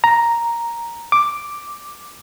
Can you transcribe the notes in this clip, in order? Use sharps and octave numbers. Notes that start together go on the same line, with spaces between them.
A#5
D6